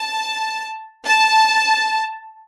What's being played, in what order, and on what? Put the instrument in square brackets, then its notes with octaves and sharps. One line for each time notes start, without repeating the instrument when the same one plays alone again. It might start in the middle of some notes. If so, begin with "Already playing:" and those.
Already playing: [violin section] A5
A5